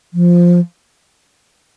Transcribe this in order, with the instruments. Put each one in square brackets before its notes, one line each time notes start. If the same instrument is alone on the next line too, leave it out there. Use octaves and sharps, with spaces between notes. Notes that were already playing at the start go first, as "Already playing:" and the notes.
[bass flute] F3